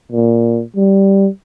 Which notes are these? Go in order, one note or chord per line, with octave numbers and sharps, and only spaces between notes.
A#2
G3